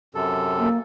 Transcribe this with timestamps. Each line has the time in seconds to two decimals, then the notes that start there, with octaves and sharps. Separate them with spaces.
0.15 F#2 C3 A4
0.59 A#3